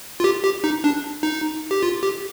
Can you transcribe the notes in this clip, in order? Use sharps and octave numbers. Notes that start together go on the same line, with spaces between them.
F4
G4
G4
D#4
D4
D#4
G4
F4
G4